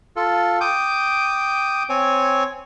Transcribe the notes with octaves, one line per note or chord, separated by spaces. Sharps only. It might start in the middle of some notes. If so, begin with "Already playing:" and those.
F4 A4
G5 D6 D#6
C4 C#5 G#5